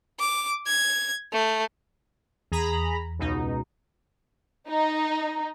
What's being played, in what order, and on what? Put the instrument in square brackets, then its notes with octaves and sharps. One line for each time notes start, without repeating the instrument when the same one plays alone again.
[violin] D6
G#6
A3
[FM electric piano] E2 [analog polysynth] G#4 A#5 B5
[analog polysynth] C#2 B2 D#4
[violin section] D#4